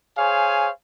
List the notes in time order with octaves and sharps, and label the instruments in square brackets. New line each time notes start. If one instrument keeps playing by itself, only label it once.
[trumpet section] G#4 C5 C#5 F5 G#5